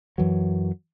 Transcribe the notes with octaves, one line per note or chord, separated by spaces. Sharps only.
F#2 E3 F#3